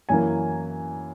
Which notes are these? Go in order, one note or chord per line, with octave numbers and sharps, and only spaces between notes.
F#2 E3 A#3 G#5